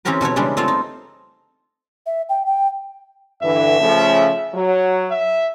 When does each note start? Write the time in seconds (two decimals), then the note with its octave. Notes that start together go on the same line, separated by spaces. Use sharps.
0.05 E3 C4 C#4 G4 A#4 B4
0.21 B2 A3 F#4 C#5
0.36 C#3 E3 G3 G#3 C#4 D4
0.57 A3 C4 F4 A4 F5
0.68 D#4
2.06 E5
2.29 G5
2.46 G5
3.43 G2 D3 E3 E5
3.79 C#3 F3 A3
4.55 F#3
5.11 E5